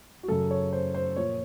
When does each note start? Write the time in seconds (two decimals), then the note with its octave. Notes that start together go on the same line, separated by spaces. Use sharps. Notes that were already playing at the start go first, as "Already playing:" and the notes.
0.23 F#4
0.28 F#2 C#3 F#3 A4
0.51 C#5
0.73 C5
0.94 C5
1.16 A#2 F3 C#5